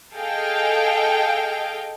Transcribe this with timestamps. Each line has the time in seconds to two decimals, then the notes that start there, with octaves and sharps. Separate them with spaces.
0.14 G#4 A4 D#5 F5 G5